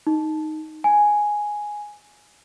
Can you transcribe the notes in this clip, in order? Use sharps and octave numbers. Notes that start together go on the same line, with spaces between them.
D#4
G#5